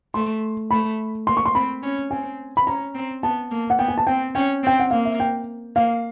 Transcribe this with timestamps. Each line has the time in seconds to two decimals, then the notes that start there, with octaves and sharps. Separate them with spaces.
0.14 A3 C6
0.71 A3 B5
1.27 A#3 C6
1.37 C#6
1.46 C6
1.55 C4 B5
1.83 C#4
2.11 C4 G#5
2.57 B5
2.67 C#4 A#5
2.94 C4
3.23 B3 A5
3.51 A#3
3.70 F#5
3.79 B3 G5
3.88 G#5
3.98 A5
4.07 C4 G5
4.35 C#4 G5
4.63 C4
4.67 G5
4.80 F#5
4.91 A#3 F5
5.05 E5
5.20 G5
5.76 A#3 F5